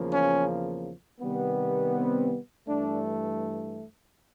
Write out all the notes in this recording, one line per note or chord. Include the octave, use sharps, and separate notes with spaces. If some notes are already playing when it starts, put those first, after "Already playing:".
Already playing: E2 C#3 F3 A#3
C#4
C3 D#3 G3 B3
C4
G2 E3 A3 D4